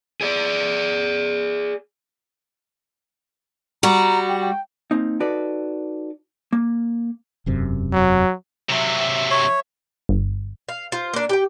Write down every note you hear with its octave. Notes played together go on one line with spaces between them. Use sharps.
G#4 D5
G3 F#4 A#5
G4
G5
A#3 C4 D#4
D#4 F#4 A4 B4 D5
A#3
E1 F#2 C3
F#3
C3 F#3 E5
C#5
G1
F5
F4 C5
A#3 D4
G4 G5